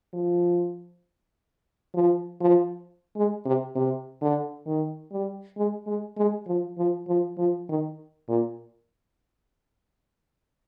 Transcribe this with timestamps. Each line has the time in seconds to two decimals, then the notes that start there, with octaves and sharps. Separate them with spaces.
0.14 F3
1.95 F3
2.41 F3
3.16 G#3
3.46 C3
3.76 C3
4.22 D3
4.67 D#3
5.12 G3
5.57 G#3
5.87 G#3
6.17 G#3
6.47 F3
6.78 F3
7.08 F3
7.38 F3
7.69 D#3
8.29 A#2